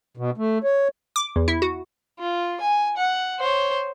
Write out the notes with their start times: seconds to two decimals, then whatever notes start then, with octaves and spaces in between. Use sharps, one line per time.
0.17 B2
0.38 A3
0.64 C#5
1.16 D6
1.36 E2
1.48 E4
1.62 F#4
2.19 F4
2.61 G#5
2.97 F#5
3.39 C5 C#5